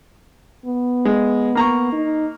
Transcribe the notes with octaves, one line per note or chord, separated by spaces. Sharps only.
B3
G#3
A#3 A#5 C#6
D#4